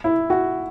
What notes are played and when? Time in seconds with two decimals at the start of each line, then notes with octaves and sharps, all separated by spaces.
0.04 E4
0.30 F#4